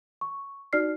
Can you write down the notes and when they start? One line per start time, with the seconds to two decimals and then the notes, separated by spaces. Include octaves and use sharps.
0.21 C#6
0.73 D#4 F#4 D5 F6 C7